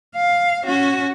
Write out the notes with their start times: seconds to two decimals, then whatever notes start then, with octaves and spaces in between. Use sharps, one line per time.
0.16 F5
0.64 C#4 F#4